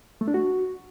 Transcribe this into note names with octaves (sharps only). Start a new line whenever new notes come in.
A3
D4
F#4